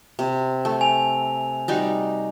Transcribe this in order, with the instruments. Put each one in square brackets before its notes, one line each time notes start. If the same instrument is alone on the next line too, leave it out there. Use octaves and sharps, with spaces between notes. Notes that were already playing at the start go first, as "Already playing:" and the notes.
[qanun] C3
A3
[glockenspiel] G#5 F7
[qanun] G3 D#4 F#4